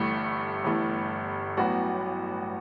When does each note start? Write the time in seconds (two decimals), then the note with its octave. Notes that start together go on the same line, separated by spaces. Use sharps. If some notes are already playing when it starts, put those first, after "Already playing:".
Already playing: G1 G2 E3 A3
0.64 G1 G2 E3 A3
1.57 A1 A2 F#3 B3 F#4